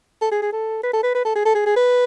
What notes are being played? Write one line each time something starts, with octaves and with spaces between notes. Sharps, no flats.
A4
G#4
G#4
A4
B4
A4
B4
B4
A4
G#4
A4
G#4
G#4
B4